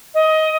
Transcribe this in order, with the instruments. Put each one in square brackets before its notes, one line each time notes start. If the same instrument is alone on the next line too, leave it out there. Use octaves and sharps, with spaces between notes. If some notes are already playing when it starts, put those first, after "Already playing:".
[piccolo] D#5